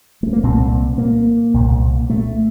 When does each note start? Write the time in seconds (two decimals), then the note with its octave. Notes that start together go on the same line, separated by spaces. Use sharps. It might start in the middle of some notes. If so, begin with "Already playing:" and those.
0.23 A3
0.33 A#3
0.43 C2 A#2 C4
0.98 A#3
1.54 C2 A#2
2.10 A3